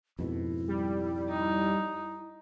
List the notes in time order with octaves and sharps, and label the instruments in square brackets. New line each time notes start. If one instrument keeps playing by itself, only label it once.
[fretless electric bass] F2 G#2 B2 [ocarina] E4
[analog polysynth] G3
[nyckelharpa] D#4